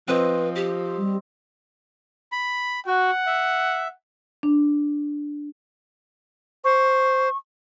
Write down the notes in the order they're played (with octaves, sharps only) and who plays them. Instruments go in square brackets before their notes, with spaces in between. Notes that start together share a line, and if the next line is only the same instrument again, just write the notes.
[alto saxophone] F3 [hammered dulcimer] C4 D#5 [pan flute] B4
[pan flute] G4
[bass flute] G3
[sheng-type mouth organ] B5
[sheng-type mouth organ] F#4 [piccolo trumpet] F#5
[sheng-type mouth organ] E5
[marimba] D4
[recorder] C5 [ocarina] C#6